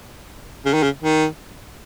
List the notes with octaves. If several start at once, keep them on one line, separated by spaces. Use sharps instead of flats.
C#3
D#3
C#3
D#3